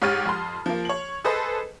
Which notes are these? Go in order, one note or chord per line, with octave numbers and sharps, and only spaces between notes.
G#2 G4 C#5 F6 A6 D#7
F2 C6
F3 A#3
C#5 F#7
G#4 A4 B4 C5 D#5